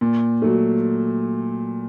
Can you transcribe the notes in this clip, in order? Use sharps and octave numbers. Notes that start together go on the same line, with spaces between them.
A#2
F#3 A3